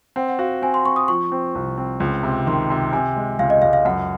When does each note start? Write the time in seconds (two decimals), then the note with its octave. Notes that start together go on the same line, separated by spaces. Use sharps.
0.16 C4 F#5
0.29 F#5
0.39 F#4 F5
0.62 C4 G#5
0.74 C6
0.85 C4 C#6
0.96 D#6
1.08 F3 C#6
1.32 C4
1.55 C2
1.78 C4
2.00 C#2
2.23 C3
2.47 D#3 C6
2.70 C3
2.92 C3 G#5
3.16 G#3
3.39 C#2 F5
3.50 D#5
3.62 C#2 F5
3.73 F5
3.85 F#2 F#5